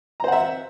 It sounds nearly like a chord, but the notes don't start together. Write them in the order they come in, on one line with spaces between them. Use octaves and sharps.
A#5 C5 F#5 E5